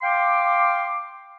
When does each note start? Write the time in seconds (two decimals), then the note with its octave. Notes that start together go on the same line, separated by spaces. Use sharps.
0.02 F5 G5 C6 D6